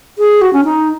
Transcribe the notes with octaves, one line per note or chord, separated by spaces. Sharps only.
G#4
F#4
C#4
D#4